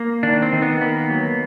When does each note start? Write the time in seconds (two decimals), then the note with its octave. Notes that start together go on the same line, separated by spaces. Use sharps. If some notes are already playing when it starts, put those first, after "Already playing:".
Already playing: A#3
0.23 D#3 D4
0.42 C4
0.53 D#3
0.62 B3
0.81 A#3 B3
1.10 F#3